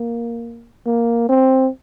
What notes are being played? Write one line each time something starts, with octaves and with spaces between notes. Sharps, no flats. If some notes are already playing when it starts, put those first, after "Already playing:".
Already playing: A#3
A#3
C4